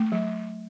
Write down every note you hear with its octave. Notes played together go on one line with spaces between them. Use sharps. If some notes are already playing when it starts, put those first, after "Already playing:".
Already playing: A3
F#3